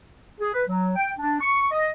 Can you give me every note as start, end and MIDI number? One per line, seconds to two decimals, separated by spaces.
0.40 0.54 68
0.54 0.62 71
0.67 0.90 54
0.96 1.12 79
1.18 1.40 62
1.41 1.65 85
1.71 1.89 75